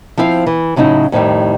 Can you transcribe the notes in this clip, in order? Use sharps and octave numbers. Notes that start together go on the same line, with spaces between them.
F3 C4 E4 F5
E3
A2 C#3 F#3 D#4 E4
F2 A2 D#3 G3